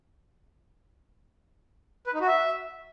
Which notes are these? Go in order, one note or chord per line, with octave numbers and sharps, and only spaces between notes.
B4
D#4
F#4
E5